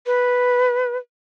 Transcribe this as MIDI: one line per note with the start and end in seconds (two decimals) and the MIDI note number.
0.06 0.97 71